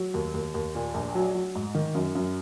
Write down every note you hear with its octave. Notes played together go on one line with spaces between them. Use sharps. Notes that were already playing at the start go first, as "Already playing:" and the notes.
Already playing: F#3
D#2
D#2
D#2
A#2
A#1
F#3
F#3
G#2
D#3
F#2
F#2